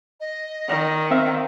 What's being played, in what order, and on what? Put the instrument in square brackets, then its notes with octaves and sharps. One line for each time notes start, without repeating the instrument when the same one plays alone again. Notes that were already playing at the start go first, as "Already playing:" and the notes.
[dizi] D#5
[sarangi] D#3
[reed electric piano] C4 E5 F5